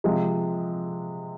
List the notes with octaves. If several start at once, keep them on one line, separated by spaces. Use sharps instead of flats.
C3 F3 G#3